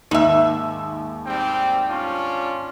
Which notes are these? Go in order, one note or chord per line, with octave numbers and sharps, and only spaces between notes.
D#2 G#2 E5
G3 C4 G5
C#4 D4 F4